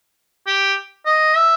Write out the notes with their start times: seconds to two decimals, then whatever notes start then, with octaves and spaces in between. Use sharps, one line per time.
0.46 G4
1.06 D#5
1.36 E5